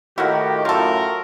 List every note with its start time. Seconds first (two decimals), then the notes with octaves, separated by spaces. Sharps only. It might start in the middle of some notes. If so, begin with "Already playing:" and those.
0.18 A2 D#3 A#3 E4 F#4 G4
0.65 F#2 A2 F4 A4 A#4